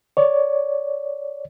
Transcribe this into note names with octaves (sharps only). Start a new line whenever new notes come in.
C#5 D5